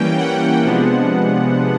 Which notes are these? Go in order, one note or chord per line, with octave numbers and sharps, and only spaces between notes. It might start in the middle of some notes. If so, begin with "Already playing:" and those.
Already playing: E3 G3 A#3 C#4 G5
F#5
C3 F3 G#3 B3 D4